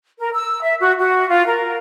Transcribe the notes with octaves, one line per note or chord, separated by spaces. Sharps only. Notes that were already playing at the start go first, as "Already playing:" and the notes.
A#4
E6
E5
F#4
F#4
F4
A#4